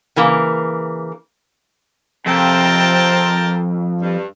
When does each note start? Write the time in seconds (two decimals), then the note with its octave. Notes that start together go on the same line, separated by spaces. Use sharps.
0.16 C#3 E3 A#3
2.26 F2 C3 C4 A#4 G5 A5
4.02 G2